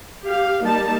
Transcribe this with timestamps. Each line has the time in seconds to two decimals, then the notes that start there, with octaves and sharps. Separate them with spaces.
0.25 G4 F5
0.64 G3 A#3 D#4 A5